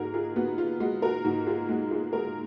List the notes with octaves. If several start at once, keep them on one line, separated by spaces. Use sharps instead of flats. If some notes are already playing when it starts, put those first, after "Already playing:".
Already playing: G#2 F#4 G#4 A#4
F4 G#4
B3 F#4
F4
G#3 F#4
F#4 A#4
G#2 F#4
F4 G#4
G#3 F#4
F4 G#4
G#3 F#4 A#4